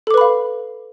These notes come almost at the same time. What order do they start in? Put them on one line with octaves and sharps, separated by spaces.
A4 D6 B4 B5 F5